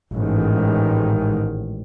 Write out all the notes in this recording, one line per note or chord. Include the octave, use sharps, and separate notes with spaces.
A1 G#2 D#3